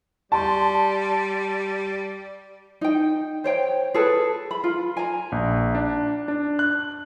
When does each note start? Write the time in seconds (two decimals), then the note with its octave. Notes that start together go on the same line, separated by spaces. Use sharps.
0.32 G3 A5 C6
2.81 D#4 G5
3.44 C5 C#5 G5
3.94 G#4 A4 B4
4.51 B5
4.64 F4
4.97 G#5 A#5
5.32 A#1
5.75 D4
6.28 D4
6.59 F#6